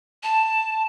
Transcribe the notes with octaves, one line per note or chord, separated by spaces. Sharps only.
A5